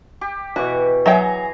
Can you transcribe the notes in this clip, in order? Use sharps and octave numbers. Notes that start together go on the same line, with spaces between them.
G4
B2 E3 F#4
F#3 G#4 E5 G5 G#5 A#5